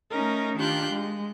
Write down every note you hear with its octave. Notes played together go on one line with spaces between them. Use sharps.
A3 C#4 D#4 A#4
D#3 D4 F4 G4 F#6 G6
G#3